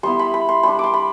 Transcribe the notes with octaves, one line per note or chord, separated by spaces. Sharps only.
G3 B3 E4 C6
B5
B5
C6
G3 D4 B5
C6 D6
B5